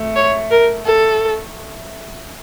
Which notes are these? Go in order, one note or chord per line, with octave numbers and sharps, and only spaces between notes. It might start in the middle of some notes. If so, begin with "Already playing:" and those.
Already playing: A3
C#5
A#4
A4